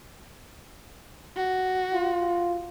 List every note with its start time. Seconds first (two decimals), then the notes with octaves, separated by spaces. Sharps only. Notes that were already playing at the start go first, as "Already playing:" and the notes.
1.36 F#4
1.93 F4